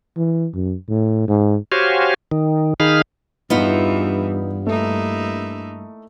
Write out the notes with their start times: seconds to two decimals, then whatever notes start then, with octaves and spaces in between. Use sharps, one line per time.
0.17 E3
0.55 F#2
0.89 A2
1.28 G#2
1.72 F#4 G4 C5 C#5 F5 G#5
2.32 D#3
2.80 D#3 D#4 G#4 F5 B5 F6
3.50 E2 G2 E3 B3 D#4 F4
4.67 A3 A#3 D#4 E4